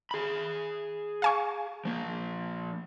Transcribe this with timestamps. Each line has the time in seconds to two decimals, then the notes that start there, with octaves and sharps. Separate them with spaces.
0.11 G#4 B5
1.22 F5 G#5 C#6
1.85 F3 A#3